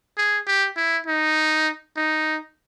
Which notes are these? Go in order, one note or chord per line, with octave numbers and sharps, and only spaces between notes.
G#4
G4
E4
D#4
D#4